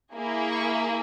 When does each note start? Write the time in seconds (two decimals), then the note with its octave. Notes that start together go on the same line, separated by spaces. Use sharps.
0.15 A#3 E4 G#4
0.51 C#6